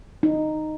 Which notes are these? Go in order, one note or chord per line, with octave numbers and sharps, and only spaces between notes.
D#4